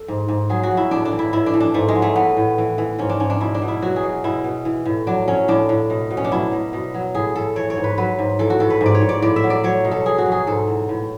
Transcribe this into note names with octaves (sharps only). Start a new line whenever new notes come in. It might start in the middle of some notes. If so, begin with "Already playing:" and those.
Already playing: A4
G#2
G#2
F#3 G#4
F#4
F#3
E4
A2 D4
D4
E3
E4
A2 E4
D4
E3
D4
G#2 A3
G#3
F#3
A3
E3 B3
A2
E3
E3
G#2 C#4
D4
G#2 C#4
D4
B2 E4
D4
B2
E4
F#3 F#4
G#4
B2
B2 E4
B2
E3
A2
F#3 D4
F#3 C#4
A2 D4
A2
B2
B2
C#4
D4
F#3 E4
B2
B2
F#3
A2 G#4
A2 A4
E3 C#5
C#5
G#2
B4
F#3 B4
G#2
E3 A4
F#4
A2 A4
B4
G#2
D5
C#5
G#2
D5
A2 D5
E5
F#3
D5
F#3 C#5
B2
A4
B2 G#4
F#4
F#3
G#4
G#2 A4
E3
A2